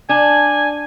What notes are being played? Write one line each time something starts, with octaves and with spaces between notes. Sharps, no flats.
D4 G#5